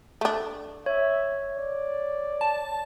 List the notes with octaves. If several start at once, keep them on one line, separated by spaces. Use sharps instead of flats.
A3 D4
C#5 E5
D5
A5